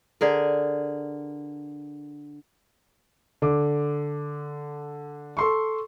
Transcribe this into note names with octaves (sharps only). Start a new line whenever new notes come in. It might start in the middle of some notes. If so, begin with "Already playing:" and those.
D3 G#4 A#4
D3 D6
A4 C6 C#6